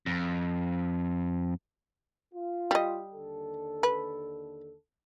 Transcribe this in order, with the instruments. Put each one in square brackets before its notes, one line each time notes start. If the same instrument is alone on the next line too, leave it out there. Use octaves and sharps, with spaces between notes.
[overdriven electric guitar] F2
[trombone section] F4
[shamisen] G3 D#5
[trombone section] D#2 D3 A4
[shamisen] B4